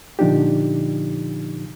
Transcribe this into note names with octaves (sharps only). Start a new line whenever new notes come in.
A#2 D3 F3 D4 D#4 G4